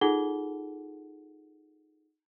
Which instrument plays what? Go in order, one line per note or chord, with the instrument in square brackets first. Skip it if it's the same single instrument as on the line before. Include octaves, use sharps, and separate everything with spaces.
[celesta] D#4 F4 G#4 A4 F#5 G7